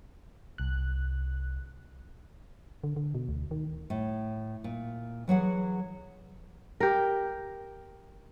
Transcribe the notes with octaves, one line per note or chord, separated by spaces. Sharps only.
C2 F#6
D3
D3
B2
D2
D#3
A2
A#2
E3 F#3 G#4 F#5
G4 A#4